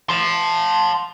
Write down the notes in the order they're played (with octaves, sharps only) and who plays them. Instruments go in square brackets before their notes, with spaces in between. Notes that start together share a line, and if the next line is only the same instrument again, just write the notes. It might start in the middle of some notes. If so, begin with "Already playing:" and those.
[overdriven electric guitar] A5 C6